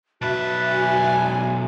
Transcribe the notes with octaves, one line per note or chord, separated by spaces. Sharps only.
B1 F#4 B4 E5 A5
G#5